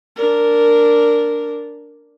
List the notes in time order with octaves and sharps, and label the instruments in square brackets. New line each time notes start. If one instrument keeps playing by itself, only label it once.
[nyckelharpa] D4 A#4